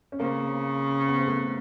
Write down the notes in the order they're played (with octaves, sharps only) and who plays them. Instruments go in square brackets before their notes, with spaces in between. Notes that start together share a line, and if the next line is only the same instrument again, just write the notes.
[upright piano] C#4
[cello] C#3 [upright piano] A#3 C4
[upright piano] B3
C4
A3 B3